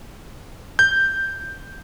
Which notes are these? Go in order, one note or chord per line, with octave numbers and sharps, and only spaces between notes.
G6